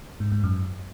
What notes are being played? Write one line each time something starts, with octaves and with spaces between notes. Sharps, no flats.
G#2
G#2
F#2